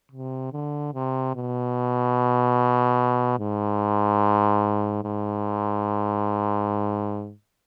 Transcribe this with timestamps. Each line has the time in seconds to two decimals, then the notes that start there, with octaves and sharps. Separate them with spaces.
0.11 C3
0.53 D3
0.94 C3
1.35 B2
3.39 G#2
5.04 G#2